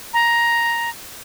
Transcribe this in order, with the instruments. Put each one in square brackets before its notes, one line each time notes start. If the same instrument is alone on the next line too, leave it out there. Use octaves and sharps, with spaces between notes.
[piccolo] A#5